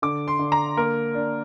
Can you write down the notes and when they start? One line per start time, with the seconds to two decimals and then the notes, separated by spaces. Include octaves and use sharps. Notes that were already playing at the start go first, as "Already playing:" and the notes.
0.02 D3 D6
0.28 C6
0.39 D3
0.52 A#5
0.77 A#3 A#4
1.14 D4